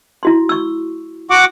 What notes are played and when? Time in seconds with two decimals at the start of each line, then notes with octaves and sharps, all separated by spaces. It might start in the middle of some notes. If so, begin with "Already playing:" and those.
0.23 E4 F#4 C6
0.49 C#6 E6
1.31 F#4 F#5 D6